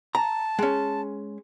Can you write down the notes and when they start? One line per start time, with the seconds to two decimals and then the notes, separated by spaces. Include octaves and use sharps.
0.15 A5 A#5
0.59 G#3 C#4